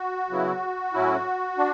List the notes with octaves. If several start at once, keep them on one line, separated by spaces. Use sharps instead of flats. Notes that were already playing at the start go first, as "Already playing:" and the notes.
Already playing: F#4
C#3 F#3 B3 E4
A2 F#3 C#4 E4
D4